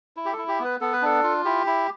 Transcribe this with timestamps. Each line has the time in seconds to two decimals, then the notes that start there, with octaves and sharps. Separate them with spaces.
0.17 E4
0.25 G4
0.33 A4
0.38 E4
0.48 G4
0.60 B3 B4
0.81 B3 A4
0.93 B4
1.02 D4 A4
1.23 F4
1.45 E4 G4
1.66 E4